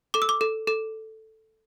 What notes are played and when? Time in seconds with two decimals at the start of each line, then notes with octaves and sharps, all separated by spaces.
0.14 A4 D6
0.22 E6
0.29 D6
0.41 A4
0.67 A4